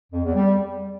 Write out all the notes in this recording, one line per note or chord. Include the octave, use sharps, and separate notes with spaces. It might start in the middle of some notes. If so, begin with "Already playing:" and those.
F2
E2
G3